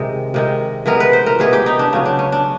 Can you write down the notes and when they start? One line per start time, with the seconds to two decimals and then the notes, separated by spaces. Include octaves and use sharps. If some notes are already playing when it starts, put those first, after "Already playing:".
Already playing: C3 D#3 G#3
0.34 C3 D#3 G#3
0.86 C3 E3 G#3 B3 A#4
1.00 B4
1.13 C5
1.26 A#4
1.39 C3 E3 G#3 B3 G#4
1.53 G4
1.66 D#4
1.79 D4
1.93 C#3 F#3 B3 C#4
2.05 D4
2.19 C#4
2.32 D4